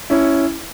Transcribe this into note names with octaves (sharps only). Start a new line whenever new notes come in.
C#4 E4